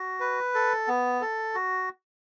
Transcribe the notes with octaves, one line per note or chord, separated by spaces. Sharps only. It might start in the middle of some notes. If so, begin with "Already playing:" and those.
Already playing: F#4
B4
A4
B3
A4
F#4